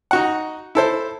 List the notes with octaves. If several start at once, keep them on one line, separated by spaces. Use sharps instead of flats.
D#4 F#4 F#5
E4 A4 C5